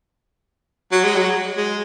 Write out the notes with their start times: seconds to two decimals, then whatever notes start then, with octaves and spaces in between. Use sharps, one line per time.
0.92 F#3
1.04 G#3
1.15 F#3
1.57 G#3